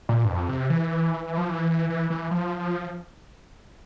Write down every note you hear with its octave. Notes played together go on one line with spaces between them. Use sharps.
A#2
G2
F2
C3
E3
F3
E3
E3
E3
F3